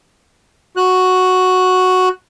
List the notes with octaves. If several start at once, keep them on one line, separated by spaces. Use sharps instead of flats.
F#4 F#6